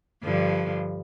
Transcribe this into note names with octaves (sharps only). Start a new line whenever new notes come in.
G2 D3 F3